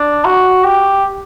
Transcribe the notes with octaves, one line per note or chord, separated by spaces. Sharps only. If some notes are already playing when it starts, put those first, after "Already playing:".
Already playing: D4
F#4
G4